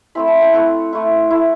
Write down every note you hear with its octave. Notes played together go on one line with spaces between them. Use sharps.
A3 C4 E4 B5
A5
G5
A3 C4 E4 F#5
A3 E4
A3 E4